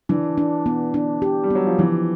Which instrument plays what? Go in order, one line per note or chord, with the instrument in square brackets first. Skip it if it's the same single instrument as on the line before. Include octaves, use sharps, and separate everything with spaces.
[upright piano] E3 [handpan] D4
[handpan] D4
B3
D4
G4
[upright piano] G3
[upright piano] F#3 [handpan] B3
[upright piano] F3
[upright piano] E3 [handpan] F3